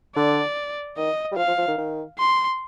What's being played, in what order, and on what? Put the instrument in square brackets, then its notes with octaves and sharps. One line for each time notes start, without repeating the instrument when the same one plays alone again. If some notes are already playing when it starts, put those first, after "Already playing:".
[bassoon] D3 [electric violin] D5
[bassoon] D#3 [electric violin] D#5
[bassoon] G3
[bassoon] F3 [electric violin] F5
[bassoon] F3
F3
D#3
D#3
[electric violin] C6